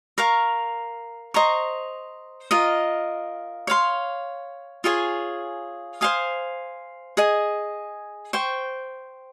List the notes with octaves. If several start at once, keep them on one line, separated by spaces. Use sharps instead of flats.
A#4 F5 A#5 C#6
C5 D#5 A#5 C#6
F4 A#4 D#5
C#5 F5 C6
F4 G#4 C#5 G#5
C5 F5 G#5 D#6
G#4 D#5 G#5
C5 G5 C#6